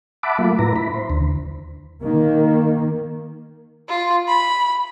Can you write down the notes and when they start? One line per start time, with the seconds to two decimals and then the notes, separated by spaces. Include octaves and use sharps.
0.23 E5 F#5 A5 B5 D6
0.38 F#3 A3 A#3 F4
0.59 A2 E4 B4 A#5
0.76 E4 B5
0.94 C5
1.10 D#2 D3
2.01 D#3 A#3
3.89 F4
4.27 B5